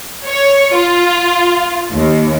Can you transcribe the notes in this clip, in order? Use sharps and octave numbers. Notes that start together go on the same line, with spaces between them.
C#5
F4
D#2